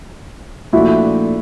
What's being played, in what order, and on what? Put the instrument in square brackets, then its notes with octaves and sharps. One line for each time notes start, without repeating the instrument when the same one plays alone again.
[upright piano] A#2 F3 A3 D4 [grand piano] E4 F#4